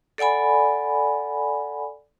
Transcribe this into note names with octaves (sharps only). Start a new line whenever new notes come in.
A4 D5 F#5 G#5 B5